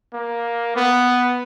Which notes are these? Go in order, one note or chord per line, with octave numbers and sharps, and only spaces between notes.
A#3
B3